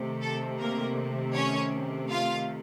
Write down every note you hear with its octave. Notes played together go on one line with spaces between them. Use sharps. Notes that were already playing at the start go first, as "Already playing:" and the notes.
Already playing: C3 D#3 A3
A4
A#3 A#4
C#4 C#5
F4 F5